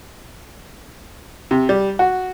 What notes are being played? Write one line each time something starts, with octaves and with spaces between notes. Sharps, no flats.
C3
G3
F#4